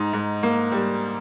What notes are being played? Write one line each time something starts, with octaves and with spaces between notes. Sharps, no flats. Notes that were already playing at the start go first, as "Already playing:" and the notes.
Already playing: G#2 D#4
G#2
A#3
G3